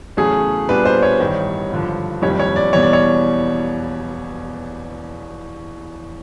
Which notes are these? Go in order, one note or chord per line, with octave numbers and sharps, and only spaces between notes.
E2 C#3 F#3 A3 C#4 G#4
A#2 G3 B3 D4 F4 B4
C5
C#5
A1 G2 D#3 G3
G#1 G2 D3 F3
F#1 F2 C3 D#3 G3 C#5
C#5
D5
E1 E2 B2 G3 C#5
D5
C#5